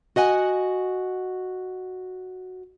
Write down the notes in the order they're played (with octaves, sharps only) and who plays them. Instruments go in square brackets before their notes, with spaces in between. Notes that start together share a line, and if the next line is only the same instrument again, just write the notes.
[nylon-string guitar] F#4 D#5 F#5 G#5